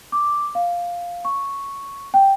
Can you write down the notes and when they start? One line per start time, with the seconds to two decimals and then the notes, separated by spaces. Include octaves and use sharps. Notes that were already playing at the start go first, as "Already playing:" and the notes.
0.12 D6
0.55 F5
1.25 C#6
2.14 G5